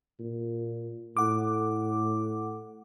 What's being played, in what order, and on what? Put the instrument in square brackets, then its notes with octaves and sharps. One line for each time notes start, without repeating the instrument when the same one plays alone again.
[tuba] A#2
[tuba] A2 [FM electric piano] F#5 D6